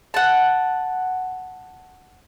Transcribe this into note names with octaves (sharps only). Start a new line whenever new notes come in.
F#5 A5